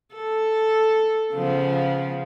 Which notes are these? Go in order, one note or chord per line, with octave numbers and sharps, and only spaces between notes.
A4
C#3 F3 B3